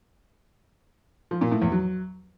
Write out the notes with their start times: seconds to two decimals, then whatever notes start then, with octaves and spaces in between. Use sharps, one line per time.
1.31 F3
1.41 A#2
1.51 A2
1.62 E2
1.72 F#3